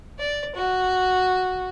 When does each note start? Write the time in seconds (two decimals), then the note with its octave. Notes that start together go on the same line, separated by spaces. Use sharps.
0.20 D5
0.55 F#4